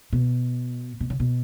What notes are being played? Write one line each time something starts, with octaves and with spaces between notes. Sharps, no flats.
B2
B2
C#3
B2